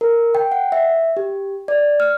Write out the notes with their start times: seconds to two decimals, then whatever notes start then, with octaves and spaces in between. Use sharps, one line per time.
0.01 A#4
0.35 G5
0.52 F#5
0.72 E5
1.17 G4
1.68 D5
2.00 F6